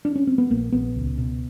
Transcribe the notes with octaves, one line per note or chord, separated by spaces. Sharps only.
D4
C#4
C4
B3
A#1 A#3
A#1 B3
C#2
B2